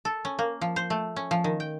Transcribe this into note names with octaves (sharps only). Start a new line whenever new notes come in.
A4
C#4
A#3
F3
C5
A3
C#4
F3
D#3
G5